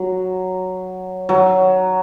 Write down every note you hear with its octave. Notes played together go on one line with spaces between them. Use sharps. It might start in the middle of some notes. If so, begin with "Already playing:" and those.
Already playing: F#3
F#3